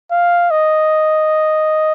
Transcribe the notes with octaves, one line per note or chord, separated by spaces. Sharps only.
F5
D#5